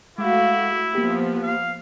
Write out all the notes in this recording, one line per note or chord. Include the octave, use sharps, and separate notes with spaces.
G#3 A3 E4 F#4 F5 G5 D6
F3 A#3 B3 G4 A6 B6 D7
F5